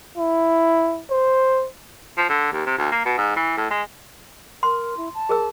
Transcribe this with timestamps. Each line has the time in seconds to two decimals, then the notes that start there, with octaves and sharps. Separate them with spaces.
0.17 E4
1.10 C5
2.17 F3
2.29 D3
2.52 D#2
2.66 C3
2.78 D2
2.92 A#3
3.05 B2
3.17 G#2
3.36 E3
3.57 A2
3.70 G#3
4.63 A#4 C6
4.97 E4
5.14 A5
5.29 G#4 A#4 E6